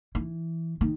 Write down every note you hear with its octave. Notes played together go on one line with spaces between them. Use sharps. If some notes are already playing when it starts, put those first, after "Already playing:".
E3
D#3